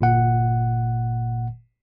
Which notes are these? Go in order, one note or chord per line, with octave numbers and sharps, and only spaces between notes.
G1 A#2 F#5